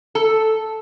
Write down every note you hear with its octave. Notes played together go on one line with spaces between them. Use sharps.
A4